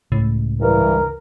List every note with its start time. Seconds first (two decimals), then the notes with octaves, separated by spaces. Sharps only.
0.12 C#2 A2
0.61 G2 E3 A#4